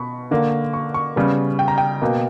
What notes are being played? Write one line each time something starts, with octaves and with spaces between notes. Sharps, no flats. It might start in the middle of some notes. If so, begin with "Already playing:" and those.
Already playing: B2 B5 C#6
D3 A#3
C#6
C#6
C#3 G3 B3
G5
A#5
G5
B2 A#3